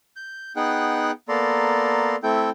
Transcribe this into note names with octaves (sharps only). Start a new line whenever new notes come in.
G6
B3 D#4 G#4 F#5 G5 F#6
A#3 B3 A4 D5 A#5 C6
A3 C4 E4 A4 G5 G6